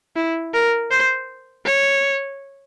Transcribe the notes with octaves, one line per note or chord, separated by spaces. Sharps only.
E4
A#4
C5
C#5